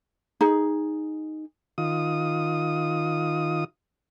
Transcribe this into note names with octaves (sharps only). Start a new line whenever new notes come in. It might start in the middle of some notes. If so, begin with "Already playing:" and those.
D#4 G#4
D#3 F4 D#6